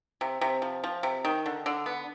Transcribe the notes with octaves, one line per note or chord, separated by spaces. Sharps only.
C3
C3
F3
F3
C3
D#3
D3
D3
B3